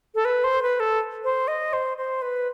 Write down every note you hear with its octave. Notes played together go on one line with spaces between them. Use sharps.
A4
B4
C5
B4
A4
C5
D#5
C5
C5
B4